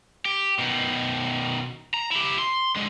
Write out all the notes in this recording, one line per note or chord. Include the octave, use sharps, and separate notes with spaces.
G4
B2 D#3
A#5
E4 G4
C6
D3 G#3